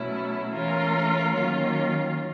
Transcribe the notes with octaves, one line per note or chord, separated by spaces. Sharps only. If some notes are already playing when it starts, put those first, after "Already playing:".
Already playing: B2 F#3 A3 C#4 E4
E3 A3 C#4 F4 A#4
D#3 F#3 A#3 C#4 F4